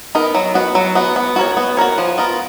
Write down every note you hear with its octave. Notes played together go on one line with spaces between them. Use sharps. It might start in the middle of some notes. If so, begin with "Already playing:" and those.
B3 D#4 A#4
F#3
B3 F#4
F#3
B3 F#4
B3
F#4 A#4 C#5
B3
F#4 A#4 C#5
F3
B3 F4 A#4